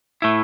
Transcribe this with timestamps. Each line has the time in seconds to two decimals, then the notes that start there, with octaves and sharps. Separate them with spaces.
0.22 A2 A3 E4